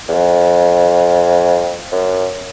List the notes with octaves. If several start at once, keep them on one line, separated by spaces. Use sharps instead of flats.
E2
F2
F#2